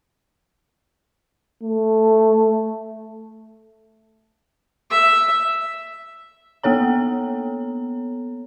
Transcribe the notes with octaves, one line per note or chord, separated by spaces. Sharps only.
A3
E5
A#3 B3 A4 C#5 A#5